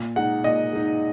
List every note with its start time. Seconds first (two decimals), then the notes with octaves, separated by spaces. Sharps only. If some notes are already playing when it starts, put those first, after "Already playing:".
Already playing: A#2
0.16 G#3 D#4 F#5
0.44 A#2 D#5
0.73 G#3 D#4